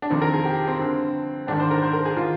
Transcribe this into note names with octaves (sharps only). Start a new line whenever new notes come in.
D4
F2 D#3 C4
A#4
G#4
G4
C4
G2 D3
G#2 D#3 D4
C5
A#4
C5
A#4
G#4
D#3 F4